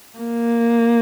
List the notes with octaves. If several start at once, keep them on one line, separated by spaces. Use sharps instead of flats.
A#3